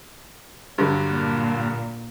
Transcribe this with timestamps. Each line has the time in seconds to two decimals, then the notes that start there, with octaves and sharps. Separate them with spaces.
0.78 G2 D3 F#3
1.14 A#2